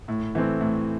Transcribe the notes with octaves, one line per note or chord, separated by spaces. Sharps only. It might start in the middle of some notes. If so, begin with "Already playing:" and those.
A2
E3 A3 C4
A2